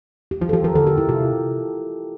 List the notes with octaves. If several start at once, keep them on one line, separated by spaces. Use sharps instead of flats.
G4
F3 F4
A4
F3 G4
F3 A#4
D3 A4
G4
E4
C3 F4